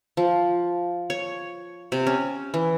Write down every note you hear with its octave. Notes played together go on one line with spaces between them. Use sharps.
F3
C#5
C3
C#4
E3